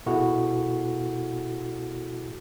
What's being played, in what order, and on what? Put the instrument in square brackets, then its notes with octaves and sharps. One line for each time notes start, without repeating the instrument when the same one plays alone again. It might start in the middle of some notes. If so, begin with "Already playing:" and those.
[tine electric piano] B2 E4 F#4 G#4 A4